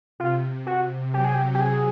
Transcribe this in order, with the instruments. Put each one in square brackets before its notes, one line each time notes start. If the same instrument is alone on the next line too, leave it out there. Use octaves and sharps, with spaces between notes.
[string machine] C3 [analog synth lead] F4
[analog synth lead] F#4
[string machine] F#3 [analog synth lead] G4
[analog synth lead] G#4
G4
G4
G#4